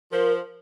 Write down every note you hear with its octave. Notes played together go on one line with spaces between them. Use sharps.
F3 A#4